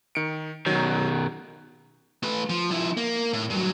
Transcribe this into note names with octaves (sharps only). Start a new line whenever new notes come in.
D#3 C#7 D7
B2 D#3 F#3
A3 B4
F3
F3 E4
A#3
A2
G2 F#3